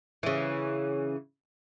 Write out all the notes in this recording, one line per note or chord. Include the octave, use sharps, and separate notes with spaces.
C#3 E3